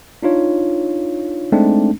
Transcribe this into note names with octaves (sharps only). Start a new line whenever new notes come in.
D4 D#4 F4 C#5
G#3 A3 C4 D4 D#4